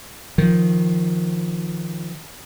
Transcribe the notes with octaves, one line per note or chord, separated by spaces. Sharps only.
D#3 F3